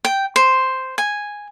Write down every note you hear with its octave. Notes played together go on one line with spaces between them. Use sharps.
G5
C5
G#5